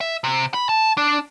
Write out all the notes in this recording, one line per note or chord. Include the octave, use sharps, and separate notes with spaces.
E5
C3
B5
A5
D4